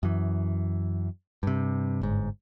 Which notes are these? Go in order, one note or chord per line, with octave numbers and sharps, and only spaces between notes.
F#2 E3
G2 C3
G1 G#2